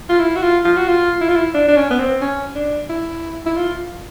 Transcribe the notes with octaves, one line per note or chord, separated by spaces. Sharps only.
F4
E4
F#4
F4
F4
F#4
F4
E4
F4
E4
D4
D4
C#4
B3
C4
C#4
D4
E4
E4
F4